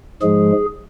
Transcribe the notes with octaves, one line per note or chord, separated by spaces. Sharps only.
G#2 F3 G#3 G#4